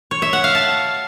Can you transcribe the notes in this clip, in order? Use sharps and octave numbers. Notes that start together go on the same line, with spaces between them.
C#5
E5
F#5
F5
A5